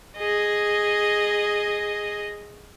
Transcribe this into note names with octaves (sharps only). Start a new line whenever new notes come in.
G#4 D#5